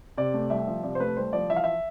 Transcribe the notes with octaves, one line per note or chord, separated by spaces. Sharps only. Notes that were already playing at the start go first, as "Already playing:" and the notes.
C3 D5
A3
C2 E5
F3
C3 D5
C5
A3 B4
C2 C5
F3 D5
E3 E5
F5
E5